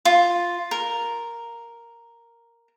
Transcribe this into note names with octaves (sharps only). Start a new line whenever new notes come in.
F4
A#4